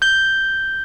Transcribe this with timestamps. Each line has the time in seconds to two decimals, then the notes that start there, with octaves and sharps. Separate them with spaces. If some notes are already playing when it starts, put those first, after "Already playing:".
0.02 G6 G7